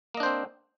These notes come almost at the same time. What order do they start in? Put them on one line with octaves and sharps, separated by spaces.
A#3 D#5 D4 C5 C4